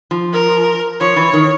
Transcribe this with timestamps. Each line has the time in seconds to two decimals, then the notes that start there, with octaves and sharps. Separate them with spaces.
0.11 F3
0.33 A#4
1.00 F3 C#5
1.16 E3
1.33 D#3